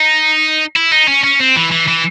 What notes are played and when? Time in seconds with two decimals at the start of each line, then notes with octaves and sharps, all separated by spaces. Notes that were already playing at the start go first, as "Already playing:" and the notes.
Already playing: D#4
0.76 E4
0.92 D#4
1.08 C#4
1.24 C#4
1.40 C4
1.56 E3
1.72 E3
1.88 E3